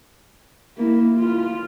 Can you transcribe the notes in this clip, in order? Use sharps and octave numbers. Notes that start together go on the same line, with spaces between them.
A#3 E4
F4